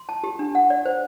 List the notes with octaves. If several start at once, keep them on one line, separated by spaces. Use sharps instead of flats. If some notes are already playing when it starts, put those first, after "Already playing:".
Already playing: C6
A5
G4
D4
F#5
D5
C5